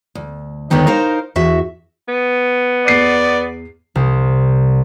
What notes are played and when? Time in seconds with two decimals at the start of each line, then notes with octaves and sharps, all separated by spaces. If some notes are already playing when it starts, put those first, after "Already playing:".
0.15 D2
0.70 D#2 D3 D#3 B3 D#4 G5
0.87 D#4 A#4 C5 F5
1.36 E2 F#4 E5
2.09 B3
2.87 E2 D5 C7 D#7
3.95 C2